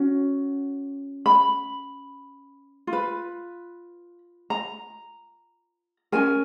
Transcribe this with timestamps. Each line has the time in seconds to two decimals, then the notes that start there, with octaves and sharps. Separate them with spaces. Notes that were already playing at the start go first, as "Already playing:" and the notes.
Already playing: C#4 F#4
1.26 B5
2.87 F4
2.93 B4
4.50 A#5
6.12 C#4 F#4 A#4 G#5